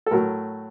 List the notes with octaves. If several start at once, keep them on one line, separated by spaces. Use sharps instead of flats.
A4
A2 F#3 A3 A#4